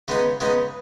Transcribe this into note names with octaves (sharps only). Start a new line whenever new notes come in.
C#3 G#3 B3 D#4
C#3 G#3 B3 D#4